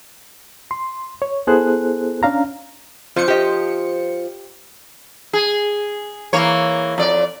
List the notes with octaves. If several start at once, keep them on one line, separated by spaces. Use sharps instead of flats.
C6
C#5
B3 E4 G#4 A4 C5 F#6
C#4 D4 F5 A#5
F2 F3 C5 C#7
G4 D#5
G#4
E3 A#3 C#5
F2 D5